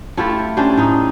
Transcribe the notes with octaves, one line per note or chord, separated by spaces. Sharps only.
A3 E4 F4 G4
C#4 D4 G4 C5
A2 D#4